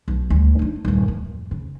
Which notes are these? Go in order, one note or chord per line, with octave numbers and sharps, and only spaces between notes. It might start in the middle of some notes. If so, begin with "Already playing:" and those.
B1
D2 G3
D4 D#4
D#1 G2
D1 F2
C#3